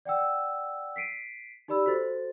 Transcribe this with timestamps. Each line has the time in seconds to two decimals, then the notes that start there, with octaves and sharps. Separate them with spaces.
0.05 D5 F#5 G5 E6
0.96 B6 C7 D7 D#7
1.68 D#4 G4 D5 B5 E6
1.86 F#4 A4 C5 A6